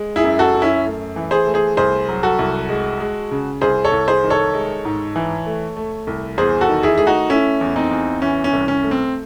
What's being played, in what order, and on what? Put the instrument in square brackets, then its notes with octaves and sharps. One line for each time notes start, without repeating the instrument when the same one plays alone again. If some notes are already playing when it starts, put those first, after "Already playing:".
Already playing: [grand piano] G#3
E4 G#4
F#2
F#4 A4
F#2
C#4 E4
A3
E3
G#4 C5
A3
G#4 C5
C2 G#4 C5
F#3
F#4 A4
C2
G#3
G#3
C#3
C2 G#4 C5
A4 C#5
C2
G#4 C5
D#3
A4 C#5
G#3
G#2
E3
A3
A3
C2
E2 G#4 C5
F#4 A4
D#3
E4 G#4
A3 G#4
D#4 F#4
A3 C#4 E4
E2
C4 D#4
E2
E3 C#4
C#4
C2
C#4
A3
C4